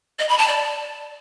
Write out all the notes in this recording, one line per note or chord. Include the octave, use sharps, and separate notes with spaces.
D#5
B5
A5
D5